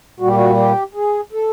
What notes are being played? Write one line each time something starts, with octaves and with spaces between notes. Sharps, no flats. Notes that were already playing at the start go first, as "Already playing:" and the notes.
A#2 G3 F#4
G4
F#4
G4
G#4
A4